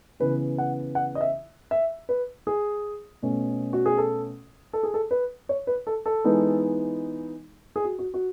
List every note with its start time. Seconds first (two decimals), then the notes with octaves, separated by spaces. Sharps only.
0.20 C#3 E3 B3 B4
0.58 F#5
0.95 F#5
1.15 D#5
1.21 E5
1.71 E5
2.09 B4
2.47 G#4
3.22 B2 A3 C#4
3.73 F#4
3.86 G#4
3.98 A4
4.73 A4
4.83 G#4
4.94 A4
5.11 B4
5.49 C#5
5.67 B4
5.87 A4
6.06 A4
6.24 E3 G#3 B3 D#4
7.76 G#4
7.84 F#4
7.99 F#4
8.14 F#4